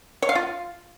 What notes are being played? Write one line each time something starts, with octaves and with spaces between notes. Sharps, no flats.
C#5
F5
F4